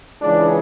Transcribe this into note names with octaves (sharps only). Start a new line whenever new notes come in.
C#2 C#3 E3 D4